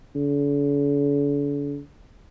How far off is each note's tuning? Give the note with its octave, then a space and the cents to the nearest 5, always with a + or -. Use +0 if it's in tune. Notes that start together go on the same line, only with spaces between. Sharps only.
D3 -45